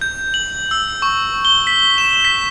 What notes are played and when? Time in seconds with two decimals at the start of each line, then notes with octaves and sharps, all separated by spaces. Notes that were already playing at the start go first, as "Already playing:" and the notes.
0.01 G6
0.34 F#7
0.71 E6
1.02 C#6
1.45 G7
1.67 B6
1.98 E7
2.25 B6